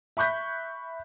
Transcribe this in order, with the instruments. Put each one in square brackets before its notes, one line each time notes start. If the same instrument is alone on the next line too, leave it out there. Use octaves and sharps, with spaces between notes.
[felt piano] E5 B5 C#6 F#6 G6 B6